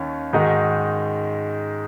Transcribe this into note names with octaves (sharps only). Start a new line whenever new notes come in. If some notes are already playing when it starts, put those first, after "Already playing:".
Already playing: D#2 D#3 C#4
G#2 D#3 G#3 D#4 F#4